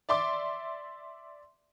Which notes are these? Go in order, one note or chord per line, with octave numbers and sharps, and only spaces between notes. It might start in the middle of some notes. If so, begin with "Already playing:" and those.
D5 E5 C6 D6